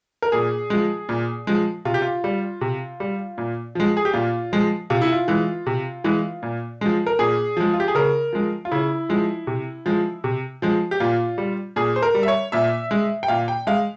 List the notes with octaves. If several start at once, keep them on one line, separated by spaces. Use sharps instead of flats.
A#4
A#2 G#4
F3 G#3
A#2
F3 G#3
C3 F4
G4
F4
G3
C3
G3
A#2
F3 G#3
G#4
G4
A#2 F4
F3 G#3
C3 F4
E4
F4
E3 G#3
C3
E3 G#3
A#2
F3 G#3
A#4
A#2 G#4
F3 G#3
F4
G4
G#4
C#3 A#4
F3 G#3
F4
C#3 E4
F3 G#3
C3
F3 G#3
C3
F3 G#3
G4
A#2 F4
G3
A#2 G#4
C5
A#4
G3
E5
C#5
A#2 E5
G#3
G5
A#2 F5
G5
G#3 F5